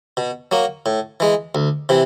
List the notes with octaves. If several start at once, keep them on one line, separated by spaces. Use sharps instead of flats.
B2
F#3 A#3
A2
E3 G#3
D2
C3 E3